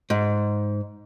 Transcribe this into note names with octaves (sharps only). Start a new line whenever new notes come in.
G#2